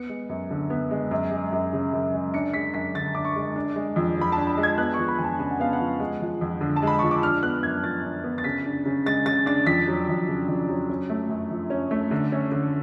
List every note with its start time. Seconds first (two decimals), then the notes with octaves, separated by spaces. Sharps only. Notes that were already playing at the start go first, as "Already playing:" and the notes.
Already playing: B3 C#7
0.09 G#3
0.29 F#2
0.51 D3
0.70 B3
0.91 G#3
1.11 F#2
1.31 G#3
1.52 F#2
1.73 C#3
1.93 F#2
2.13 G#3
2.34 D4 C#7
2.54 G#3 B6
2.74 F#2 B6
2.95 D3 A6
3.15 D4 D6
3.25 C#6
3.36 G#3
3.56 D4
3.76 G#3
3.96 F2
4.18 F3 B5
4.32 D4 A5
4.47 B5
4.57 G#3
4.63 G#6
4.78 B3 F#6
4.94 F3 C#6
5.08 B5
5.18 F2 G#5
5.24 A5
5.39 C#3 G#5
5.51 F#5
5.60 B3 F5
5.73 F#5
5.80 F3
6.00 G#3
6.21 F3
6.41 F2
6.61 D3
6.76 A5
6.82 G#3 B5
6.99 F3 C#6
7.11 D6
7.23 D4 F6
7.43 B3 F#6
7.63 F#2 G#6
7.83 F3 A6
8.04 D4
8.24 B3
8.38 A6
8.44 C#3 B6
8.65 D4
8.86 C#3
9.06 G#3 A6
9.26 C#3 A6
9.46 D4 A6
9.66 F2 B6
9.88 F#3
10.08 F2
10.28 C#3
10.48 F2
10.69 F#3
10.90 C#4
11.10 A3
11.29 F#2
11.51 F3
11.70 C#4
11.91 A3
12.11 D3
12.32 C#4
12.52 D3